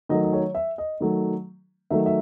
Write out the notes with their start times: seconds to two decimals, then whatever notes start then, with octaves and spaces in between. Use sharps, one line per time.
0.09 D#3 F#3 A3 D#5
0.23 D#5
0.33 C#5
0.55 E5
0.78 D#5
1.00 D#3 F#3 A3
1.90 D#3 F#3 A3 E5
2.06 E5